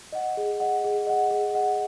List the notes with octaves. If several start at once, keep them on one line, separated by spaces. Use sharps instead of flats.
D#5 F#5
G#4
D#5 F#5
G#4
D#5 F#5
G#4
D#5 F#5